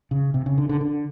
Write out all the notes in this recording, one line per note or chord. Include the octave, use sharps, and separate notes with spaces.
C#3
C3
C#3
D3
D3
D3